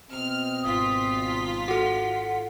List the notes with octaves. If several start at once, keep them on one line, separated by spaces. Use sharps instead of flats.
B2 C4 D#5 F6
G#1 F4 D#6 B6
F#4 A4 F#5